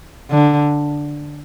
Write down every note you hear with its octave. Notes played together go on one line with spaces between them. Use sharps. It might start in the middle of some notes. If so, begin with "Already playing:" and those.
D3